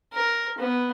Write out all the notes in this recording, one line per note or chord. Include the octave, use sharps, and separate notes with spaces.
A#4
B3